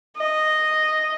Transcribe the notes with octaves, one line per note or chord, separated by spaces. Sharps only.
D#5